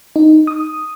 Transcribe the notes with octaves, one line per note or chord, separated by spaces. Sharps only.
D#4
D#6